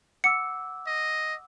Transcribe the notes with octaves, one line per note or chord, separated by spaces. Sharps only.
F#5 D6 E6 C#7
D#5